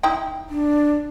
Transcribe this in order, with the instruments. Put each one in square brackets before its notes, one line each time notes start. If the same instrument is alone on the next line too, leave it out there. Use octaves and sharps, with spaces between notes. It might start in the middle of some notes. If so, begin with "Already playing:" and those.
[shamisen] D#4 E4 G5
[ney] D4